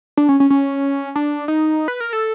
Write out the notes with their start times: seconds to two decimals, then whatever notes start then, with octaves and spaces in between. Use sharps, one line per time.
0.17 D4
0.29 C#4
0.40 C#4
0.50 C#4
1.16 D4
1.48 D#4
1.88 B4
2.00 A#4
2.13 A4